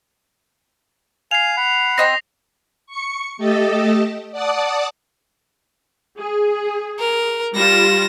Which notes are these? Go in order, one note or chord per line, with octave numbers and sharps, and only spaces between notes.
F5 G#5 C7 F7
F#5 B5
C4 D#5 G5 A#6
C#6 C#7
A3 G4 A4 D#5 A5
D5 F#5 A5 D6 D#6
G#4
A#4
G3 F4 A#6 E7